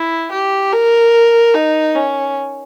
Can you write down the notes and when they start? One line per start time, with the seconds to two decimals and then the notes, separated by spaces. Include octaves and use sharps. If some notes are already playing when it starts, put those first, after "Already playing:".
Already playing: E4
0.31 G4
0.72 A#4
1.54 D#4
1.95 C#4